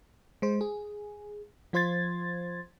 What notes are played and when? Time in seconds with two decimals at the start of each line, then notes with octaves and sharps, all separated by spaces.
0.42 G#3 C5
0.61 G#4
1.73 F3 F4 C5 C6 G#6 A6